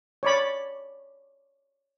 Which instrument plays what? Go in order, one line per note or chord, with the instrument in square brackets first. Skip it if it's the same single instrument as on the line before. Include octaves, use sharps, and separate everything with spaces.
[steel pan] C#5 D5 B5